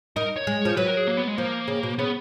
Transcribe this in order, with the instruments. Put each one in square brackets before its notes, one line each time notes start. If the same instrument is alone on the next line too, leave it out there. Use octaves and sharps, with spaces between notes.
[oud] D#4 [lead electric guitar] A#4
[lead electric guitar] C#5
[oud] G#3
F3
[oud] F#3 [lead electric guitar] B4
[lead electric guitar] A#4
G#4
A#3
B3
G#3
[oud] F3 [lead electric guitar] A#3
[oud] C#3
B2
[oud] C#3 [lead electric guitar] B3